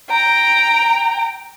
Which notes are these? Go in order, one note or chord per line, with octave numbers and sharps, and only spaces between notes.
G5 A#5